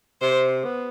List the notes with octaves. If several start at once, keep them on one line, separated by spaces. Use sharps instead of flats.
C3 C5
B3